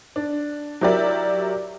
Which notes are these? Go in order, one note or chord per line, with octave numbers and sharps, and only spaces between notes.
D4
F#3 E4 G4 A#4 D5 E5